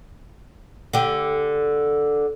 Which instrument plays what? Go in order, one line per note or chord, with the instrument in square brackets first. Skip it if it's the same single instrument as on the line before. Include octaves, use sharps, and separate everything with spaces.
[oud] D3 G4